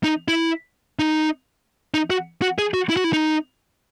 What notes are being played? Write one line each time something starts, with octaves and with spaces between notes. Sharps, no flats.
D#4
E4
D#4
D#4
F#4
F#4
G#4
F#4
E4
F#4
E4
D#4